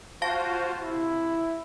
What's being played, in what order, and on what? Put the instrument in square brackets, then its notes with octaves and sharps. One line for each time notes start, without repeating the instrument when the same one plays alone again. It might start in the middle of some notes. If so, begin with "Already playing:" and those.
[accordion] F4 F#4 C5 [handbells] F5 A5 A#6
[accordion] C3 [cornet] E4